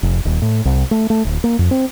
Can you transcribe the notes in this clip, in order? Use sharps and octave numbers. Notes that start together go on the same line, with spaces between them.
F1
D#1
A2
C2
A3
A3
D1
A#3
F2
C4